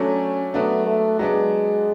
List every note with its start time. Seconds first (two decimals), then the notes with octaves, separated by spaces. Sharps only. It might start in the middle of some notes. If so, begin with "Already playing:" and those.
Already playing: F#3 A3 C#4 D4
0.54 F#3 A3 B3 D4
0.86 A3
1.19 F#3 G#3 B3 D4